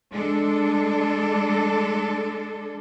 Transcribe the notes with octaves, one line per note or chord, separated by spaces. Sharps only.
G#3 D4 A4